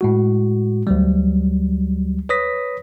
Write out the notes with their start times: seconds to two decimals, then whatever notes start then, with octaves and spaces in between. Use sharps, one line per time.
0.01 A2 G#3 F#4
0.87 D2 F#3 G3
2.29 B4 C#5 D#6 A#6 B6